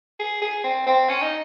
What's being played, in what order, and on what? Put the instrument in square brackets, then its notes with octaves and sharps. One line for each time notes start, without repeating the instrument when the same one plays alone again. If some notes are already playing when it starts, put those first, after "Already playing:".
[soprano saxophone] G#4
G#4
C4
C4
C#4
D#4